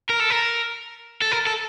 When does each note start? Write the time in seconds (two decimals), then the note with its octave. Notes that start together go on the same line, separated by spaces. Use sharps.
0.10 A#4
0.20 A4
0.31 A#4
1.22 A4
1.32 A#4
1.47 A4